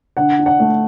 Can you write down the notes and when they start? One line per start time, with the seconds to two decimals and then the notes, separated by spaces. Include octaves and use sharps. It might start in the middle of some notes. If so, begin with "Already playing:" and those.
0.17 D3 F#5
0.39 D4
0.46 F#5
0.60 A3